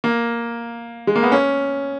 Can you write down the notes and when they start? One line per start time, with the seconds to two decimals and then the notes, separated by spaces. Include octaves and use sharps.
0.04 A#3
1.07 G#3
1.16 A#3
1.23 B3
1.32 C#4